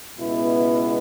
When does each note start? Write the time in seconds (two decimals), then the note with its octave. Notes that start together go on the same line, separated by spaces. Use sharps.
0.17 C#2 B2 G#3 B3 E4